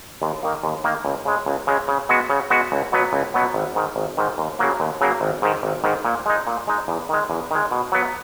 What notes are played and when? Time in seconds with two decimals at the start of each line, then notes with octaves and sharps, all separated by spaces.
0.22 D#2
0.43 D#3 A#3
0.63 D#2
0.84 D#3 A#3
1.05 C#2
1.25 C#3 G#3
1.46 C#2
1.67 C#3 G#3
1.88 C#3
2.09 G#3 B3 F#4
2.30 C#3
2.50 G#3 B3 F#4
2.72 C#2
2.92 B2 F#3 B3
3.13 C#2
3.34 B2 F#3 B3
3.54 G#1
3.75 G#2 D#3
3.96 G#1
4.17 G#2 D#3
4.38 D#2
4.59 C#3 F#3 A#3
4.80 D#2
5.01 C#3 F#3 A#3
5.21 G#1
5.42 G#2 D#3
5.63 G#1
5.84 G#2 D#3
6.05 A#2
6.26 G#3 D#4
6.47 A#2
6.67 G#3 D#4
6.88 E2
7.09 D#3 G#3
7.30 E2
7.51 D#3 G#3
7.71 B2
7.92 F#3 B3